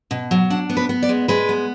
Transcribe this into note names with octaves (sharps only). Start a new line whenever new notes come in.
B2
F#3
D4 F#5
B3
B4
B3
D5
G#3
G#3 B4
B3